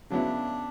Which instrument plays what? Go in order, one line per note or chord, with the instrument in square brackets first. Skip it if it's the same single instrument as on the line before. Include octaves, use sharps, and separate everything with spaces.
[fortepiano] C#3 F#3 B3 E4 [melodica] D4